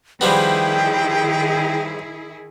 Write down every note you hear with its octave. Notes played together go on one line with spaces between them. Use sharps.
D#3 F3 G3 B3 E4 G#4 G5